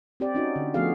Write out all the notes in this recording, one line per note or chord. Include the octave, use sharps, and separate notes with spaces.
C4 G4 D5
C#4 D#4 F#4
D3
F3 A3 B3 F#4 G#4 F5